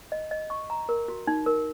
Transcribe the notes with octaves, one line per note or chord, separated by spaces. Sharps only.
D#5
D#5
C#6
A#5
A#4
F#4
D#4
A#4